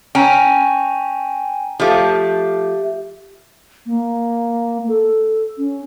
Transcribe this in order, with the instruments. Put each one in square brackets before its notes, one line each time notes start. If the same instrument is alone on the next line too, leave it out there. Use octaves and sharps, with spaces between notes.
[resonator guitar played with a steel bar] C#4 [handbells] G5 G#5 A#5
[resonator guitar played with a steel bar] F3 A3 [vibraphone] G4 E5 [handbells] F5 D6
[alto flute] A#3
A4
C#4